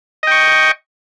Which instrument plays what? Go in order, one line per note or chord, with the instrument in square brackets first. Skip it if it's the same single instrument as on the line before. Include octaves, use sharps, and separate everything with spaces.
[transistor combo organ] D#5
G5
C#6